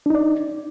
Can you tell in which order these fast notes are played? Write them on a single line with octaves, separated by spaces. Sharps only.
D4 D#4 D5